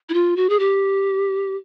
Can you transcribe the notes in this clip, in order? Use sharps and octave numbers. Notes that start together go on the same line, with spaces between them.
E4
F4
F#4
G#4
G4